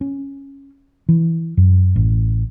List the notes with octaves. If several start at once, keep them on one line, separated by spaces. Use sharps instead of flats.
C#4
E3
F#2
A1